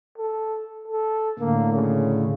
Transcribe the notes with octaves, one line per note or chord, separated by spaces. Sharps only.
A4
A4
A2 D3 A#3
C#3